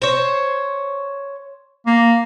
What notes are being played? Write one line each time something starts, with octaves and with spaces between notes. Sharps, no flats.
C5 C#5
A#3